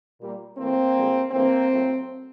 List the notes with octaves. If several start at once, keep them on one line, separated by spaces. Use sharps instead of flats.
A#2 G3 A#3
A2 E3 A3 A#3 C4
G2 D3 F3 G#3
G2 E3 A3 A#3 C4
A2 F#3 A#3